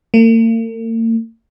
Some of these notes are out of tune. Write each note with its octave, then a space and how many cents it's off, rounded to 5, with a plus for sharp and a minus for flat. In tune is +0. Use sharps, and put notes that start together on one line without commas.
A#3 -45